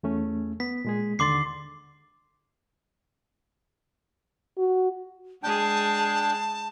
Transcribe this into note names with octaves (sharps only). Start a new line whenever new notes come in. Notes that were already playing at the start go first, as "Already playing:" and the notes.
E2 A3 C#4
B3 B6
A#2 G#3 G#4
D#2 D3 C6 D6 A6 C7
F#4
G#3 D4 G#4 G5 A5